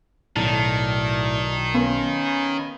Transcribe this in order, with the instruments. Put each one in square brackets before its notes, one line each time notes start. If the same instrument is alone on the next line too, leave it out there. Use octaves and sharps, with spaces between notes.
[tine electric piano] B1 A5 [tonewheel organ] A2 E4 D5 [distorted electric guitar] D#3
[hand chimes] B3 A#4 [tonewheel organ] C#4 G#5 B5